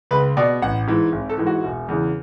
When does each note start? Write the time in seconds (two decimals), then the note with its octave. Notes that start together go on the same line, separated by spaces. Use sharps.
0.11 C#2 B4
0.37 B2 D5
0.62 A1 F#5
0.87 G#2 E3
1.12 G#1
1.29 A4
1.38 G#2 E3
1.47 F#4
1.64 E1
1.88 E2 C#3 E3